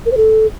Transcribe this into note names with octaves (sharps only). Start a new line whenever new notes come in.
A#4
C5
A4